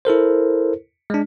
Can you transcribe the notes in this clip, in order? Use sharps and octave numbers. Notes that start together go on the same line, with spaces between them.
E4 A4 A#4 C5
G#3 D4